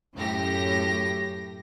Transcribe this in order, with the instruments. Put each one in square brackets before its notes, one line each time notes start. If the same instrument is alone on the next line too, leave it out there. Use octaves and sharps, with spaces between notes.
[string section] F#2 A2 G4 A#6